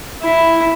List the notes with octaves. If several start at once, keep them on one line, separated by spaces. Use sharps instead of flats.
E4